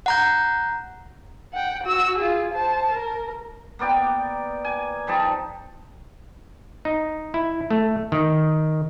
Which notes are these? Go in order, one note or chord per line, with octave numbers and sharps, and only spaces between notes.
F#5 A#5 G6
F#5 G5
F#4 E6
F4 G#4
C5 A5
A#4
A#3 B3 D5 G5
G#5
F3 G3 D#4 A5
D#4
E4
A3
D#3